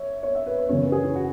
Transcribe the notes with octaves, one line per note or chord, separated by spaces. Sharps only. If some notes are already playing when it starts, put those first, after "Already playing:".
Already playing: C#5 E5
C#5
E5
B4
C#5
F#2 C#3 E3 C#5
B4
G#4
E4
F#4